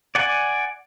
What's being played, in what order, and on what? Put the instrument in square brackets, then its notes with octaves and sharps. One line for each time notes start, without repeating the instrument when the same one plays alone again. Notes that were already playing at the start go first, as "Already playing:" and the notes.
[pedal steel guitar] D5 F#5 G#5